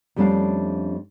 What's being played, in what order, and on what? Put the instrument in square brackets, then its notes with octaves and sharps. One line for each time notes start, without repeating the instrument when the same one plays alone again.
[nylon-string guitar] F2 G3 A3 C#4 D4 F5